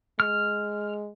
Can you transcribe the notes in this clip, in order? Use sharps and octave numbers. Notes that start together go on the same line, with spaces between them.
G#3 F6